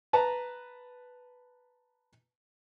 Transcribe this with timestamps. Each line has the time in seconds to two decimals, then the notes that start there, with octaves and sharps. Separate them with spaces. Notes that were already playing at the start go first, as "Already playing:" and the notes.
0.13 B4 A5 A#5